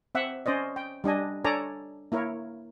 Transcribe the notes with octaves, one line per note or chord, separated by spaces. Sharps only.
C4 E5 F#5
C#4 C5 D5 D#5
G5
G3 D4 D#5 G#5
D4 A4 C#5 D5 G#5 A#5
A#3 E4 A#4 C#5